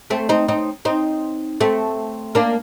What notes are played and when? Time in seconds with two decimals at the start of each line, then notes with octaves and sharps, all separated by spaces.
0.10 A3 C4
0.29 C4 D#4
0.48 C4 D#4
0.85 C4 D#4
1.60 A3 C4
2.35 A#3 D4